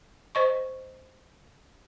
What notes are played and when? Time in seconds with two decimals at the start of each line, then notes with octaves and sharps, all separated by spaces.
0.35 C5 D#5 C#6